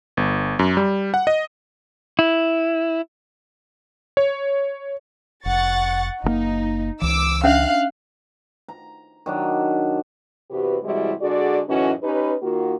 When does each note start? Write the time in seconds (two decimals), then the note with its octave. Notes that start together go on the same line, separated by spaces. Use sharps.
0.17 G1
0.59 F#2
0.77 G3
1.14 F#5
1.27 D#5
2.19 E4
4.17 C#5
5.46 F1 F#5 C#6 A6
6.24 F#1 C3 A#3 D#4
7.02 C#2 E3 D6 E6
7.44 C#4 D4 E5 F5 F#6
8.68 A#5
9.26 D#3 F#3 D4
10.51 E2 C3 F#4 G4 B4
10.84 C3 E3 G3 G#3 E4 F#4
11.21 D3 G#3 F#4 G#4 D5
11.68 F#2 A2 E3 C#4 D#4 F#4
12.03 C#4 D#4 G4 B4
12.43 D#3 A#3 F4 F#4